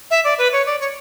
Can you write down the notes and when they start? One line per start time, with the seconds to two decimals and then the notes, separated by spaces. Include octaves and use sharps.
0.11 E5
0.25 D5
0.38 B4
0.53 C#5
0.66 D5
0.80 C#5